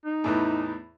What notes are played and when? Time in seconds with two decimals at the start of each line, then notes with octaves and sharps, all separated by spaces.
0.05 D#4
0.24 E2 A2 E3